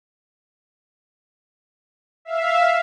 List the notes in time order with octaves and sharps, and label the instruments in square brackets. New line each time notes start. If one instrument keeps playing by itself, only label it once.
[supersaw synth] E5 F5